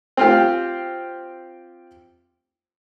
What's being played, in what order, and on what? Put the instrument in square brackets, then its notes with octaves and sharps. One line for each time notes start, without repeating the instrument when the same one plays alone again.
[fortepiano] C4 F4 G4